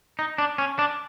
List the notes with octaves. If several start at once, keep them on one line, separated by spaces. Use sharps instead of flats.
D#4
D4
C#4
D4